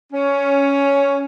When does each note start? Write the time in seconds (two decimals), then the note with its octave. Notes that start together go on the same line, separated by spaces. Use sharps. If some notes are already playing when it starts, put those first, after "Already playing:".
0.13 C#4